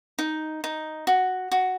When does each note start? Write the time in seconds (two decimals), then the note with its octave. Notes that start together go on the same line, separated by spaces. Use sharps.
0.19 D#4
0.64 D#4
1.07 F#4
1.52 F#4